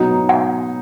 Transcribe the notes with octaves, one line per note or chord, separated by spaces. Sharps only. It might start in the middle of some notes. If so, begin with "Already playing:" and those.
Already playing: B2 F#3 B3 D#4
F#5